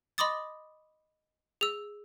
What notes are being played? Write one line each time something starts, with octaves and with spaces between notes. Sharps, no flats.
D#5 B5 C6 D6 D#6 A6
G#4 E6